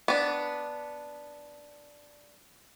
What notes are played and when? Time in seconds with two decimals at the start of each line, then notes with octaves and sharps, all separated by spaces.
0.08 B3 D4